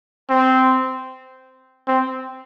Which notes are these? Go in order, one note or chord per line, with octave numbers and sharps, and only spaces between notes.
C4
C4